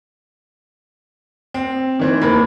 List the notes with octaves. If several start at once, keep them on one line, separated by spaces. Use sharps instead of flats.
C4
D#3 E3 C5
F1 D#2 A#3 B5